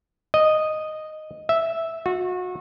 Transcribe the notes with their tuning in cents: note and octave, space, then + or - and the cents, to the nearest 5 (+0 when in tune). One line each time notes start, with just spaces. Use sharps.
D#5 -5
E5 -5
F#4 -30